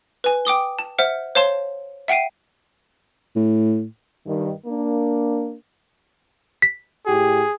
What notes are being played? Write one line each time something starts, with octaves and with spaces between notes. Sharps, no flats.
B4 G#5
G5 D6 D#6 G7
A5
C5 E5 F#5 F6
C5 C#5 F5 A5 C6
E5 F#5 G5 C7 D#7
A2
G2 D#3
A#3 D4
B6
A2 G4 G#4